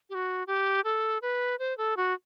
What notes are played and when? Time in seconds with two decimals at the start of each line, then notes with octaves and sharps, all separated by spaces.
0.10 G4
0.15 F#4
0.47 G4
0.84 A4
1.22 B4
1.59 C5
1.78 A4
1.97 F#4